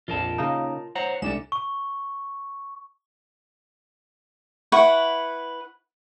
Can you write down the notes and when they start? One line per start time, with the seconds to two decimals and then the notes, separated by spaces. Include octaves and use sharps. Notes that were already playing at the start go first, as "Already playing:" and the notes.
0.08 A#1 F2 F4 A#4 A5
0.38 C#3 A#3 D#4
0.95 C5 C#5 F#5 A#5
1.22 C2 G#3 D4 A4 E7
1.52 C#6
4.72 E4 B4 F#5 C#6